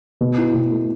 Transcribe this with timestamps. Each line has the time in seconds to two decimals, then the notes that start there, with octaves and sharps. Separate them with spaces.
0.21 B2
0.38 E4
0.54 B2
0.72 A3